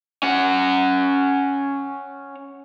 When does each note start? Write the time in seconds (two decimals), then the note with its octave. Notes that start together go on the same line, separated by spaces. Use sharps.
0.23 C#4 F#5